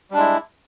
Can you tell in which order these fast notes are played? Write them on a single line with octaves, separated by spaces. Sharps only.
G3 D4 G#3 E4